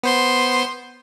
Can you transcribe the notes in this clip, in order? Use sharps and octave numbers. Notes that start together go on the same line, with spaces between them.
B3 C5 C6